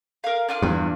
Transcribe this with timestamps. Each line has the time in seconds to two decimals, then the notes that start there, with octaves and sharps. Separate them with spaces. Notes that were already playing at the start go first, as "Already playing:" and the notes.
0.24 A#4 F5
0.48 D4 F4 F6
0.62 E2 G2